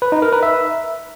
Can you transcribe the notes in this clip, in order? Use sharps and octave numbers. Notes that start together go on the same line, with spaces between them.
B4
D#4
A#4
B4
E5